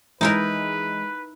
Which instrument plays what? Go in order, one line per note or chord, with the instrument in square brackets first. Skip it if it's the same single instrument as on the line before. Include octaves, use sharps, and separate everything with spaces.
[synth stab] E3 G#3 [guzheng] D#4 E4 A#4 [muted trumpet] B4